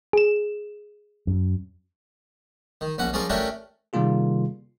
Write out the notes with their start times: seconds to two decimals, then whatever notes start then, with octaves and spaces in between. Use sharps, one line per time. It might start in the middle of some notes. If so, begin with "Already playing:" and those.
0.13 G#4 E7
1.27 F#2
2.81 D#3
2.98 A#1 C#4 F#4 F#5
3.13 F3 C#4 G#4 A#4 D5
3.29 A3 C#4 D4 F#4 G4 A#4
3.93 C3 D#3 G3 A#3 F4 G#4